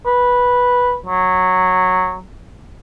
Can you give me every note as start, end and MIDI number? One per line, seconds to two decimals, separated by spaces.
0.06 0.96 71
1.06 2.18 54